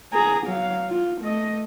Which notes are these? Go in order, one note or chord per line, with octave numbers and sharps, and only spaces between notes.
G#4 A#5
F#3 F5
F4
A3 D#5